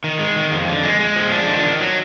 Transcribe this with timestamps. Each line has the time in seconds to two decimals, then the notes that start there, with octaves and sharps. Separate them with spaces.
0.04 D#3
0.19 G#3
0.36 D#3
0.52 F2
0.68 D3
0.83 G#3
1.00 G#3
1.16 F3
1.32 D4
1.48 D#3
1.63 D#3
1.80 F#3